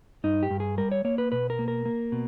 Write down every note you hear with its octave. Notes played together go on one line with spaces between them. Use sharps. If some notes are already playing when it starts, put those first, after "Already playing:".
G2 D#4
G4
G2
G#4
G3 A#4
C#5
A#3 C#5
B4
B2 B4
A#4
A#3
A#4
A#3
B2